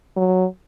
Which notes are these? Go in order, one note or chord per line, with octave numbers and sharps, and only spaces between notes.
F#3